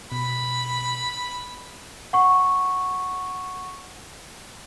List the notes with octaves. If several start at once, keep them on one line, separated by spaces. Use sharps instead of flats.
B2 B5
F#5 C#6